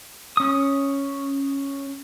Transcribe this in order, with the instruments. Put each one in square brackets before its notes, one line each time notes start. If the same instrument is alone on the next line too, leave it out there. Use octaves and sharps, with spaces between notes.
[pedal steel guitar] C#4 D#6